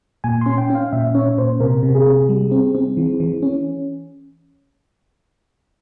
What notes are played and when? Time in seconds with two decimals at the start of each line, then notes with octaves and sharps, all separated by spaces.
0.24 A#2 G#5
0.41 C#4 C6
0.58 G5
0.70 C#4
0.75 F5
0.93 A#2 E5
1.15 C#4 C#5
1.38 A#2 C5
1.60 C3 A#4
1.83 C3
1.95 G#4
2.06 C3
2.29 G3
2.51 C4
2.75 C4
2.97 E3
3.20 E3
3.42 C#4